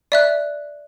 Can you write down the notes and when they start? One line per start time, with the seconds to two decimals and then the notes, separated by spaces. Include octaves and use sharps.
0.12 D5 E5 F#6